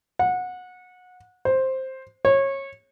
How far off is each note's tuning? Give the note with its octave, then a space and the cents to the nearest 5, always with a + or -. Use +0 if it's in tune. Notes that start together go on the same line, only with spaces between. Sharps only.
F#5 -25
C5 +5
C#5 -25